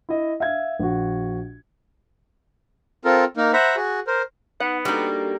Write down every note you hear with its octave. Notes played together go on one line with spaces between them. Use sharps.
E4 D#5
E5 F5 G#6
A#1 F#4
C4 F4 A4 A#4
A#3 D#4 A#4
C5 E5 F#5 A#5 B5
F#4 G#4
A#4 C5
B3 D#4 F#5
G3 A#3 D4 D#4 F#4 A4